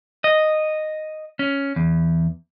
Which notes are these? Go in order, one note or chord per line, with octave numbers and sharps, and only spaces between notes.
D#5
C#4
E2